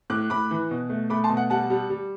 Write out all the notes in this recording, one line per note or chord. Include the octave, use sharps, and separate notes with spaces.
A2 D6 F#6
A2 B5 D6
E3
B2
A3
A3 B5 D6
A5 C6
B2
F#5
G3 F#5 A5
G3
G3